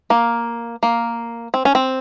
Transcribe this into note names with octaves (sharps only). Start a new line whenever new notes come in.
A#3
A#3
C4
C#4
C4